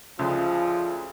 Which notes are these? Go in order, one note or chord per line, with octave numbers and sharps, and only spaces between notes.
D2 C#3 F3 G#3